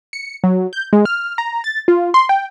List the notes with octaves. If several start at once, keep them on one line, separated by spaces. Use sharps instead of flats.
C#7
F#3
G6
G#3
F6
A#5
A6
F4
C6
G5